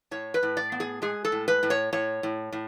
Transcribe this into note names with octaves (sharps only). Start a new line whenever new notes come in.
A2 C#5
B4
A2
D5
B3
G#4
G#3 G#4
A4
A2
B4
A2
C#5
A2 C#5
A2
A2